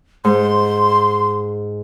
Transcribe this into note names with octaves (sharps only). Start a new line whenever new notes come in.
G#2 C6